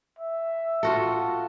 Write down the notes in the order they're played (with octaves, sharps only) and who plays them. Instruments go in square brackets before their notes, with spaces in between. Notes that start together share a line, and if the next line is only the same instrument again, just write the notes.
[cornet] E5
[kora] F4 F#4 A4